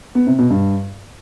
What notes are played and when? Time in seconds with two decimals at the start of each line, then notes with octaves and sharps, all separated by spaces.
0.15 B3
0.27 C3
0.39 B2
0.50 G2